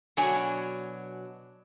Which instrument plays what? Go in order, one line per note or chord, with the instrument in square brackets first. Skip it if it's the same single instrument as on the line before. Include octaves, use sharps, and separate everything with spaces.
[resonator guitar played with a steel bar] B2 F#3 D4 C#5 G#5